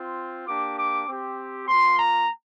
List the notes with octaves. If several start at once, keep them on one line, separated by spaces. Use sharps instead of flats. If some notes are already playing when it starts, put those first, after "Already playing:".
Already playing: C4 F4
A#3 D4 G4 D6
D6
C4 G4
A#3 F4 C6
A#5